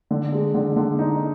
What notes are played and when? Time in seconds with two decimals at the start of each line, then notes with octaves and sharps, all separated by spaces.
0.11 D3
0.32 G#3
0.54 D3
0.76 D3
0.99 D#4